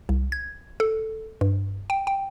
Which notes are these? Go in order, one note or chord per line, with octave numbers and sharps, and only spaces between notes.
C2
G#6
A4
G2
G5
G5